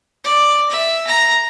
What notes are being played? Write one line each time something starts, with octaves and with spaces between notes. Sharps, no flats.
D5
E5
A#5